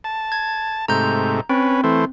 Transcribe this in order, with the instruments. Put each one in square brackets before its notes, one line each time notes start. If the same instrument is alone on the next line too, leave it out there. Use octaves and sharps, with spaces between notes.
[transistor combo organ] A5
[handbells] G#6
[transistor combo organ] G#2 C3 A3 [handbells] A#5 G6
[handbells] C4 [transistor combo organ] C#4 B4
[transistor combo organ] E3 A3 C5